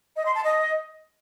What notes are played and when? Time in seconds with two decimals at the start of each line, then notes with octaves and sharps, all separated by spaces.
0.16 D#5
0.26 C6
0.35 A5
0.44 D#5